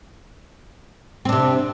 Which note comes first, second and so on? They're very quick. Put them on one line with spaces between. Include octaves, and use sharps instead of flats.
C4 D4 C3